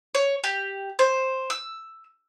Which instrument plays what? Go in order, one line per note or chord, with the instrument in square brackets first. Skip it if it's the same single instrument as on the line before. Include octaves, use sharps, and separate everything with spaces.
[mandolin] C#5
G4
C5
E6